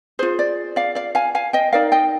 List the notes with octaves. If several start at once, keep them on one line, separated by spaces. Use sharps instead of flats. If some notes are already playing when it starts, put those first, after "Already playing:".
F4 G#4 C5
D5
D5 F5
D5 F5
F5 G#5
F5 G#5
D#5 G5
D#4 A#4 D5 F5
D#5 G5